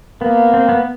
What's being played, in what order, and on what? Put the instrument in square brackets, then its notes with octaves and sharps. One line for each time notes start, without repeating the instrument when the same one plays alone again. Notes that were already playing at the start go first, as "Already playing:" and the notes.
[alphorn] A#3 [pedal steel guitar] B3
[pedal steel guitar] C4
B3